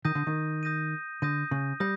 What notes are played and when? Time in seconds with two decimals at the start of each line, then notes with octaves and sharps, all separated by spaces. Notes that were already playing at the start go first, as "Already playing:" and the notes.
0.05 D#3 D#6 G6 A#6 D#7
0.15 D3
0.27 D#3
0.63 D#6 G6 A#6 D#7
1.22 D3 D#6 G6 A#6 D#7
1.51 C#3
1.80 G3 D#6 G6 A#6